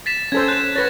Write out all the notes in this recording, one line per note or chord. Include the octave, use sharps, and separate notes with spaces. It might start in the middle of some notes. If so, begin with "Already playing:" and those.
A6 B6 E7
C#4 A4 C5 G#6
F#6 E7
B4 C#5 A6 A#6